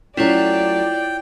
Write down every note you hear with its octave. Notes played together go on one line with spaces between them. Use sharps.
F#3 A3 C#4 E4 F4 C#5 D5 G5